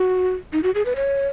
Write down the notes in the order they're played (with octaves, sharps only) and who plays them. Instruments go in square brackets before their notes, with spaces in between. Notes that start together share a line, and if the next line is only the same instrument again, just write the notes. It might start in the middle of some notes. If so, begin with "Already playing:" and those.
Already playing: [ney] F#4
D#4
F#4
G#4
B4
C#5